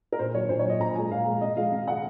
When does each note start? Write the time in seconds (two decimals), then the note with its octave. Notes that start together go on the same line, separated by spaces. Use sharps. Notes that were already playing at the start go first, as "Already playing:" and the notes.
0.12 A#4
0.19 A#2 C5
0.34 F#3 C#5
0.49 A#2 C5
0.59 C#5
0.64 F#3
0.69 D#5
0.80 A#2 A#5
0.95 F3 G#3 G#5
1.11 A#2 F5
1.27 F3 G#3
1.41 C3 D#5
1.57 F3 G#3 F5
1.72 C3 F5
1.88 F3 G#3 F#5